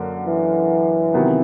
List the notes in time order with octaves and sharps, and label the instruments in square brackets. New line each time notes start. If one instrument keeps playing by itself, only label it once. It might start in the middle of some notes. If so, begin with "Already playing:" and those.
Already playing: [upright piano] F#2 D3 A#3
[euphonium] E3
[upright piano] C3 D#3 F#3 B3